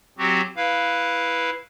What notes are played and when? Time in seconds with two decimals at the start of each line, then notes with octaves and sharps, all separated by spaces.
0.18 F#3 C4 F#4 G4
0.56 E4 B4 F5